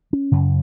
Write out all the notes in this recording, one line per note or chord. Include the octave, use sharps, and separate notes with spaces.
C#4
F#2 C#3